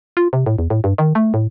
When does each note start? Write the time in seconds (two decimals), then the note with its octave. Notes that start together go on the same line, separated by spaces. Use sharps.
0.17 F4
0.33 C3
0.46 A2
0.58 E2
0.70 A2
0.84 G2
0.98 D#3
1.15 A3
1.34 A2